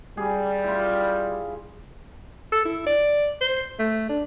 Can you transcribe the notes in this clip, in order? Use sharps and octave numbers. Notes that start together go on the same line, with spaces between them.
G3 G#4
E4 F4
A4
E4
D5
C5
A3
D4